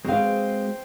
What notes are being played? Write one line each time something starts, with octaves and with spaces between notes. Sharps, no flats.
G#3 C4 F#4 G#4 C5 F5 G5